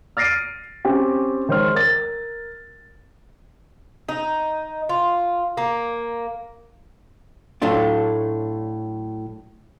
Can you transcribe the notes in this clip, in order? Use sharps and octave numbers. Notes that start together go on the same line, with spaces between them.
F6 A6 A#6 C7 D7 D#7
C4 C#4 G4
D#3 G#3 C5 C#5 C6 F6
A#4 A6
D#4
F4
A#3
A2 F#3 A3 D4 F4